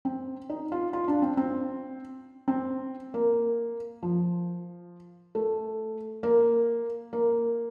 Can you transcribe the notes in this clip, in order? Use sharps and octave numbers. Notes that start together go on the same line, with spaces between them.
C4
D#4
F4
F4
D4
C4
C4
C4
A#3
F3
A3
A#3
A#3